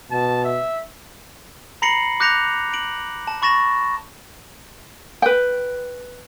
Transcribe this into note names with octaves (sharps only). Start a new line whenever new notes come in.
B2 A5
E5
A#5 B5 A#6 C7 C#7 F#7
D6 F#6 G6 A#6 C#7 F7
D7 F#7
A5
B5 C#6 A6 A#6 E7
B4 G5